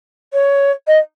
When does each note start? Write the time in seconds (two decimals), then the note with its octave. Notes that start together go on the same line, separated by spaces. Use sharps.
0.33 C#5
0.87 D#5